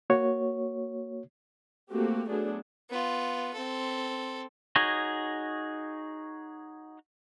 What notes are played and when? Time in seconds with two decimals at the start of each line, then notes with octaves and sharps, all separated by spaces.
0.10 A#3 F#4 C#5
1.90 A3 A#3 C4 F#4 G4
2.29 F#3 A3 B3 D4 G#4
2.90 B3 F4
3.54 C4 A4
4.76 D#4 F#4 G#4 C#5 D#5